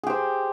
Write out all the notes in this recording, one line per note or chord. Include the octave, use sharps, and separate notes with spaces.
G4 G#4 C5